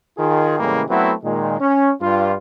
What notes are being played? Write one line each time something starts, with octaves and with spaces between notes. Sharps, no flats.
D#3 F4 G#4
A2 C#3 E3 G3 G#3 A#3
F#3 A3 B3 C4 E4 F#4
A#2 D#3 G#3
C#4
G2 F4